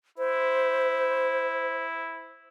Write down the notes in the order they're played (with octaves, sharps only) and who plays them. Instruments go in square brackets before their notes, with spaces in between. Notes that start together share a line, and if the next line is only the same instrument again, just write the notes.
[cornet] E4 [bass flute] C5